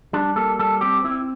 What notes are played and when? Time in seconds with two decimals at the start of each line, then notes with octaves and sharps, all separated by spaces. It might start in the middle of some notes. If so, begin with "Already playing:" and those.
0.13 G3 D4
0.36 A#3 A4
0.59 G3 A4
0.81 C4 G4
1.04 C4 E4